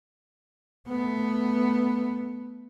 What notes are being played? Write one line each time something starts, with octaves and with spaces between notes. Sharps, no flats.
A3 B3